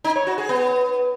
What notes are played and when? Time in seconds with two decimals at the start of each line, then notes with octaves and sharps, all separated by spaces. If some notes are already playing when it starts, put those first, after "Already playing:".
0.04 D#4
0.16 C#5
0.27 F#4
0.38 G#4
0.49 B3